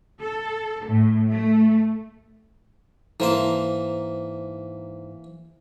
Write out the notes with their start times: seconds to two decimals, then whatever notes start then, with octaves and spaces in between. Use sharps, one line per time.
0.21 A4
0.85 A2
1.29 A3
3.20 G#2 E3 A#3 C5 A5 A#5